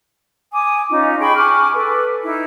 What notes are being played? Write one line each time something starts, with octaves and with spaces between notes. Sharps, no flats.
G#5 D6 D#6
C#4 D#4 F4
G#4 G5 B5 C#6
G#5 C#6 D6 F6
A4 B4
D#4 E4